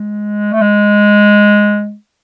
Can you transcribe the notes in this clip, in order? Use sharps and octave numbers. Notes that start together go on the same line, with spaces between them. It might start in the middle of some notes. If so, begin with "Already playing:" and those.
Already playing: G#3
A3
G#3